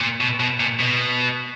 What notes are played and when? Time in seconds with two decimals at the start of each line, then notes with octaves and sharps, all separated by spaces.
0.01 A#2
0.21 B2
0.40 B2
0.60 A#2
0.80 B2